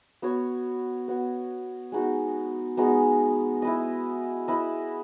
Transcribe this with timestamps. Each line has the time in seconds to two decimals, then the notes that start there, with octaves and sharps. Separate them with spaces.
0.22 B3 F#4 C#5
1.08 B3 F#4 C#5
1.92 G#3 B3 D#4 F#4
2.77 G#3 B3 D#4 F#4
3.62 E4 B4 D#5
4.48 E4 B4 D#5